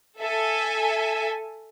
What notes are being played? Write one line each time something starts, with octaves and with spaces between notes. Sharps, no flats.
A4 E5 G#5